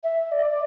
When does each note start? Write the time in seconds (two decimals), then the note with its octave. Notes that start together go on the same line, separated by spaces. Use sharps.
0.04 E5
0.32 D5